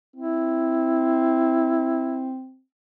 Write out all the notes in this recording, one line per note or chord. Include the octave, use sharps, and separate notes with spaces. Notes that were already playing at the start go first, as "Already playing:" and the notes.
C4 E4